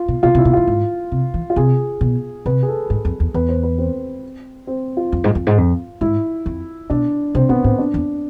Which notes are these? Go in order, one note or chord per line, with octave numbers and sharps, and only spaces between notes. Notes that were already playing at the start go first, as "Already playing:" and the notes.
Already playing: F4
B2
B2 F4
C3
E4
B2
A2 F4
G#2
C3
E3
F4
C3 G#4
B2
C3 B4
G#4
A4
G#2 A4
F2
E2
E2 B4
C5
B4
C4
C4
F4
F2
G#2
F2
G#2
F2
G#2 E4
F2
B2 D4
C3 C4
B2 B3
A2 C4
D4
E2